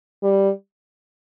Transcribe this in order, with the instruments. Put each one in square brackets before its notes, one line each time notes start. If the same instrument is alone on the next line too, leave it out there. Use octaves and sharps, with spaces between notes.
[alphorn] G3